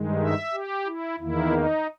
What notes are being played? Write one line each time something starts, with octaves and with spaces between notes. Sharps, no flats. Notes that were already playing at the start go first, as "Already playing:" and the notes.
Already playing: G2 D#3 G#3
E5
G4
E4
E2 D#3 A#3 E4
D#4